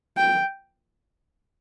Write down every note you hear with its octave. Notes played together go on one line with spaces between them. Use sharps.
G5